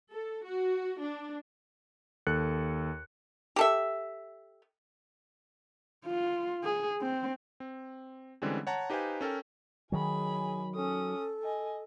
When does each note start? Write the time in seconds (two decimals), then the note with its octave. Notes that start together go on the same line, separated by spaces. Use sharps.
0.10 A4
0.44 F#4
0.99 D4
2.27 D#2 A4 F#6 C#7
3.56 G4 A4 E5
6.05 F4
6.64 G#4
7.01 C4
7.60 C4
8.42 D3 E3 G3 G#3 C4 C#4
8.67 C#5 F#5 A5 A#5
8.90 D#4 G4 B4 C5 F5 G#5
9.21 C#4 A4 A#4 G5
9.92 D#3 F#3 G#4 G#5 B5
10.74 C#4 A4 D#6
11.43 D#5 G#5